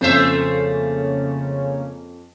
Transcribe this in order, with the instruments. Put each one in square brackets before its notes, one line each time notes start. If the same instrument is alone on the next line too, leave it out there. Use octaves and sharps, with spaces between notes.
[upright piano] F2 [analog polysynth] C#3 A#3 C#4 [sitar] A3 C5 E5